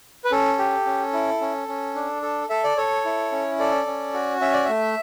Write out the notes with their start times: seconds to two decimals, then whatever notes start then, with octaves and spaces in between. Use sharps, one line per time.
0.24 B4
0.31 C#4 A4
0.58 G4
0.86 C#4
1.13 E4
1.41 C#4
1.68 C#4
1.95 D4
2.22 A4
2.50 A4 E5
2.64 D5
2.77 A4 C#5
3.05 E4
3.32 C#4
3.59 A4 D5
3.86 C#4
4.14 F#4
4.41 C#4 E5
4.53 D5
4.65 A3 E5